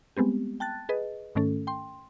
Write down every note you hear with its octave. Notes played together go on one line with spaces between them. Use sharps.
G3 G#3 B3 C4 G4
G5 A5 F#6 A6
G#4 B4 D#5
G#2 D#3 A3 C#4 A4
G5 C6